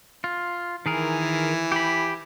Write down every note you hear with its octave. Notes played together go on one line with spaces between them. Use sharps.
F4
D#3 E3 G#4 A#4
G4 B5